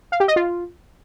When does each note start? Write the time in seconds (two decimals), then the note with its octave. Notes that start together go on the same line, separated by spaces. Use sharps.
0.12 F5
0.20 G4
0.28 D#5
0.36 F4